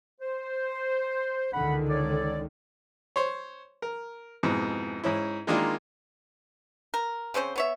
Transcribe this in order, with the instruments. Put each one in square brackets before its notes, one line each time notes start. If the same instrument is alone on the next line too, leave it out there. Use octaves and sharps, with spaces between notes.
[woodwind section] C5
[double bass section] C#2 D3 D#3 [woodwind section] F#5 B5
[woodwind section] A4 C#5 D5
[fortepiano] C5 C#5
A#4
F2 G#2 B2 E3
G#2 C#4 E4
D#3 G#3 A#3 D4 E4 F4
[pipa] A#4
C#3 C4 C#4 C5
B3 C#5 E5